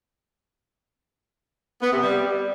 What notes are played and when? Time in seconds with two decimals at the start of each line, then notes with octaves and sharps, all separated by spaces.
1.82 B3
1.93 C3
2.03 G3